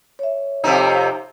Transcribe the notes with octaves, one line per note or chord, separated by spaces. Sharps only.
C#5 E5
F2 C3 D#4